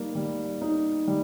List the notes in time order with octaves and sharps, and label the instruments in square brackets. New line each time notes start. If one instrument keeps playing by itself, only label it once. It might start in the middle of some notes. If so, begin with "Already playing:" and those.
Already playing: [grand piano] G3 A#3 D#4
G3
D#4
G3